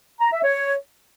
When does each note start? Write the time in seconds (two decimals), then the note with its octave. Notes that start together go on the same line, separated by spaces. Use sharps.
0.21 A#5
0.32 E5
0.43 C#5